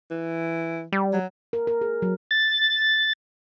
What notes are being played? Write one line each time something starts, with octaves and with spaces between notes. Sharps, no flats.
E3
G3
F#3
A#4
A#4
G#4
F#3
A6